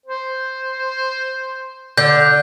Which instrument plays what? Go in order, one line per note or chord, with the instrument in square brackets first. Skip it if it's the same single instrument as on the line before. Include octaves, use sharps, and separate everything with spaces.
[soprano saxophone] C5
[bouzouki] D3 [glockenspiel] G6